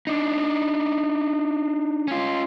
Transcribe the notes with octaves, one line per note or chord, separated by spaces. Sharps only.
D4 D#4
C#4 F4